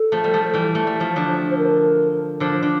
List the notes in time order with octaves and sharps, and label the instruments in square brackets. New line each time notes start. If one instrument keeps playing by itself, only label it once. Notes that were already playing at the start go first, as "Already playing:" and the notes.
Already playing: [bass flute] A4
[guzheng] F3 A3
G3
F3 A3
E3 G3
A3
G3
F3 A3
D3 F3
[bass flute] C5
A#4
[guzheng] D3 F3
D3